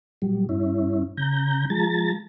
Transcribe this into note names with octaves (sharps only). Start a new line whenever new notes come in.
A#2 F#3 G3
G2 C#4 E4
C#3 A#5 G6
F3 G#3 A5 A#5 A6